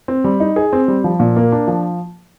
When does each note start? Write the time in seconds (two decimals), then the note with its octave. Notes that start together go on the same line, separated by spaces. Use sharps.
0.08 C4
0.24 G3
0.40 D#4
0.56 G#4
0.73 C4
0.88 G3
1.04 F3
1.20 A#2
1.37 A#3
1.52 D4
1.68 F3